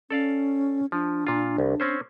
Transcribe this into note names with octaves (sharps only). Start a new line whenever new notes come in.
C#4 A4 D5 F5
F3 D4
A#2 F4
C2
C4 C#4 C5